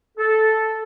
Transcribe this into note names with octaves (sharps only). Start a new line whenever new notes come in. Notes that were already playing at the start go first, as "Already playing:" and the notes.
A4